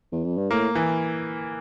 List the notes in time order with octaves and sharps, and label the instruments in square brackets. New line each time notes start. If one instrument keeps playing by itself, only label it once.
[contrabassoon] E2
F2
G2
[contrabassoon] A2 [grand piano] A#3
[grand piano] E3